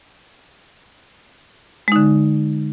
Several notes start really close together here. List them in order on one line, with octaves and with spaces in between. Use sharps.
G#3 D#4 D3